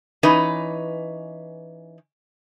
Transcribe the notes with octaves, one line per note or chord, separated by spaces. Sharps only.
E3 C#4 D#4 B4